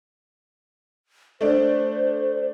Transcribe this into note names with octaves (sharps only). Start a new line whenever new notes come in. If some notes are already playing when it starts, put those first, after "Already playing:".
A3 D4 C5